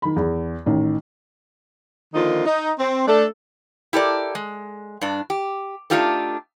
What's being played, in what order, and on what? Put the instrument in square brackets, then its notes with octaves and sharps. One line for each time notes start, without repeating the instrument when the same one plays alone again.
[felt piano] D#3 B5
E2
A1 D#3
[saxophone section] D3 D#3 F3 A#3 D#4 F4
D#4
C4
A3 D4 A4
[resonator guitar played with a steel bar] E4 G4 A4 A#4 D5
G#3
G2 D4
G4
A3 D4 D#4 F4 G4 A4